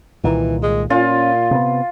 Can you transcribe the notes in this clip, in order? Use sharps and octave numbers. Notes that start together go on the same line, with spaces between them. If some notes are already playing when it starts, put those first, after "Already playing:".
C2 A#2 D#3 E3
G#3
A#2 C#4 F4
C3 B3